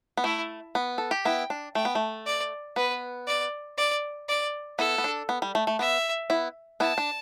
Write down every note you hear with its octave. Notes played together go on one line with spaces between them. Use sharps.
B3
A3 E4
B3
A4
G4
B3 E4 G5
D4
A3 G5
B3
A3
D5
B3 B4
D5
D5
D5
B3 E4 A4
B3
D4
B3
G3
A3
A3
B3 E5
B3 E4
B3 E4 A5
D4